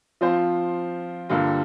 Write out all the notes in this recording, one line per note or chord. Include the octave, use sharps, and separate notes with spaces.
F3 C4 F4 C5
G2 D3 G3 A#3 F4